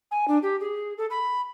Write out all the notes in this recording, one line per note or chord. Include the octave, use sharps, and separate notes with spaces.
G#5
D4
G4
G#4
A4
B5